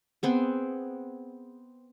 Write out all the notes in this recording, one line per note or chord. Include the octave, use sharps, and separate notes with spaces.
B3 C4 G#4